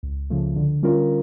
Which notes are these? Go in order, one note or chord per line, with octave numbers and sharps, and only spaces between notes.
C#2
C#3 F3 A3
D3
G3 C#4 F4 A#4